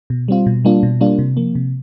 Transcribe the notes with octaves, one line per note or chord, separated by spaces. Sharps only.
B2
G3 C4 F4
B2
G3 A#3 D4 F4
B2
G3 A#3 D4 F4
C3
F3 A#3
C3